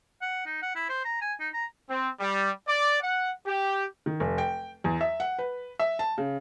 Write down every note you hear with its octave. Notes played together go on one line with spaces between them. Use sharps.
F#5
D#4
F#5
E4
C5
A#5
G#5
D#4
A#5
C4
G3
D5
F#5
G4
D#3
F1
G5
E2
E5
F#5
B4
E5
A5
C#3